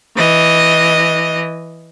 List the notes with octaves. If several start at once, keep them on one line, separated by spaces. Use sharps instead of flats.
E3 D#5